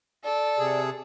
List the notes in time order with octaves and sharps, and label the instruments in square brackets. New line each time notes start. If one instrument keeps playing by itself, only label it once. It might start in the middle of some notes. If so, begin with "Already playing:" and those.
[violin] A4 [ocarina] D5
[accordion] C3 G#4